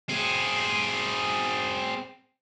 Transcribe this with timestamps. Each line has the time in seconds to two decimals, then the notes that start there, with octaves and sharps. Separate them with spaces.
0.09 C4 G#4